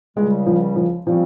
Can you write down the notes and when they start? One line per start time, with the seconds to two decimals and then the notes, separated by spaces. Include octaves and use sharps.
0.17 C#2 C#3 G3 G#3
0.46 F3
0.76 F3
1.07 C#3 F3 G3 C4